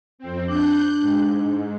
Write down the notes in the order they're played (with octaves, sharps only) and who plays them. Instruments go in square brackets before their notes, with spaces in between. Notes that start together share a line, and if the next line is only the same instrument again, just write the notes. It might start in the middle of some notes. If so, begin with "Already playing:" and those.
[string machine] F2 C4
[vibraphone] D4 [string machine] F#6 G6
[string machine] G#2